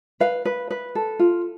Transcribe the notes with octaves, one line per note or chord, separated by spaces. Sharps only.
B4 F5
B4
B4
A4
F4